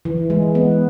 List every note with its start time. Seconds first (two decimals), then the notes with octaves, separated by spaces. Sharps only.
0.05 E3
0.30 G#3
0.55 B3